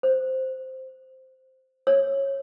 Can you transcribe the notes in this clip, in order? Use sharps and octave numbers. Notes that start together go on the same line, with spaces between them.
C5
C#5